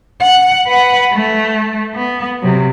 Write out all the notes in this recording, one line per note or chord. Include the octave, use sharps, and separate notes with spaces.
F#5
B4 F#5
A3
B3
C3 F#3